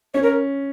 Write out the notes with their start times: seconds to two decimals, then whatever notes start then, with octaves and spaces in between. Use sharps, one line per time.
0.14 C#4 C#5
0.23 A#4